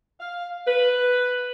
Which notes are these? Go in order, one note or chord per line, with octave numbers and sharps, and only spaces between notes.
F5
B4